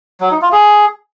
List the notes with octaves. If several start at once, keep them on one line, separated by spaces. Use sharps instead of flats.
F#3
D#4
F4
G#4